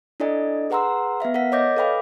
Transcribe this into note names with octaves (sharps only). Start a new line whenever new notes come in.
D4 E4 A4 D5 D#5 G#5
G#4 B4 F#5 A#5 C6 E6
B3 B4 E5 F5
A#4 F#5 B6
C#5 D#5 D6 G6 A#6
A4 B4 F5 G5 B5 D6